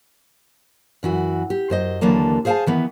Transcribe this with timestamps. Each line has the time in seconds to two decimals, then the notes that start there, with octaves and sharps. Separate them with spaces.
1.03 F#2 E3 F#4
1.50 G4
1.70 F#2 C5 D#5
2.01 D#2 D3 E3 F#3 A#3 A5
2.45 G#4 C5 F5 F#5 G#5 A5
2.66 D#3 E3 B3